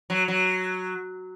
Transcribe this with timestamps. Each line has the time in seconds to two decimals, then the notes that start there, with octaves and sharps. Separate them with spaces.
0.10 F#3
0.28 F#3